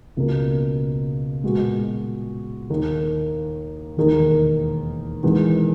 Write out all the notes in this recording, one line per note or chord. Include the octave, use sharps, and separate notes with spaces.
C#2 B2 A#3
A#2 G#3 B3 F#4
D#2 D#3 A#3
E1 D#2 D#3 A#3
E1 E2 D#3 G#3